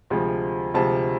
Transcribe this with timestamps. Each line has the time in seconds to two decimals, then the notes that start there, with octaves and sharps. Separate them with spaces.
0.10 D2 C3 F3 G#3
0.74 D2 C3 F3 G#3 A5